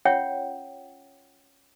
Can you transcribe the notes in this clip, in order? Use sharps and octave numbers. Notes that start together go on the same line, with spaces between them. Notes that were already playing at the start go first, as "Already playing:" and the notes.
C#4 F4 C#5 F#5 G5